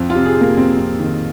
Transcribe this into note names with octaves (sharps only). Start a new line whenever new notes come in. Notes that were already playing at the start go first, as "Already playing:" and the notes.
Already playing: F2
F4
C3
G#4
C3 A#3
F2 C4
F2
D#3